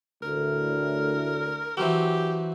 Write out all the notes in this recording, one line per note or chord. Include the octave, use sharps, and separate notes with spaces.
D2 A2 A#4
E3 F#3 C4 G4